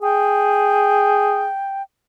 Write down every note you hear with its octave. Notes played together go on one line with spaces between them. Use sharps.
G#4 G5